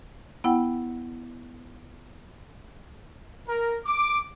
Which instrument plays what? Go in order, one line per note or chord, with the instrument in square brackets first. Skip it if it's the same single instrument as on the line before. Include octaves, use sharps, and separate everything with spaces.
[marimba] B3 E4 F#5 G5
[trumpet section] A#4
D6